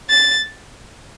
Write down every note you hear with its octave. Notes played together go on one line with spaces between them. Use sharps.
A6